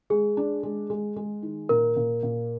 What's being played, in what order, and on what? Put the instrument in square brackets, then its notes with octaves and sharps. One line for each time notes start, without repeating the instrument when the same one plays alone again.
[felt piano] G#3 [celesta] G#4
[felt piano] D4
G#3
G#3
G#3
D#3
[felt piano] A#2 [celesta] A#4
[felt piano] A#2
A#2